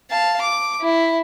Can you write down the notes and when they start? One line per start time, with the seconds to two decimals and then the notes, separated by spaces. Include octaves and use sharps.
0.10 F5 A5
0.42 D6
0.81 E4